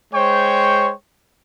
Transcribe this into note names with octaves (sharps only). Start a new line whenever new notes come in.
G#3 C5 C#5 G5 C#6